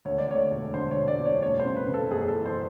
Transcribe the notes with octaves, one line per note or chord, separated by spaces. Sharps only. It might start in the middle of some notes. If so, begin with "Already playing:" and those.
D2 C#5
D5
D2 C#5
E1
D3 C5
C#5
E1
D5
E1
C#5
F#1 C#5
C5
C#3
B4
C#3
A4
F#1 G#4
A4
E3
C5